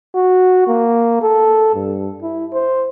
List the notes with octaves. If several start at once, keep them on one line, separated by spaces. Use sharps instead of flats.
F#4
A#3
A4
G2
E4
C5